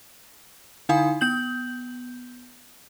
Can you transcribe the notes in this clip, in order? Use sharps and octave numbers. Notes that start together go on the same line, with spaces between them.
D3 D#4 E4 F5 G#5 D#6
B3 G6 F#7